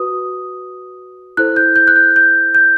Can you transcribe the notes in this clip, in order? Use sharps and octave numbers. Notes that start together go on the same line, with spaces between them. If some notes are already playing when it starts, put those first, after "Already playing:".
Already playing: F#4 B4 D#6
E4 A4 C5 F#6
G6
G6
F#6
G6
G6
G6